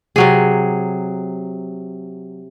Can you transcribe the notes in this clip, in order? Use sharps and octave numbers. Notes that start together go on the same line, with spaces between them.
C3 F#3 G#4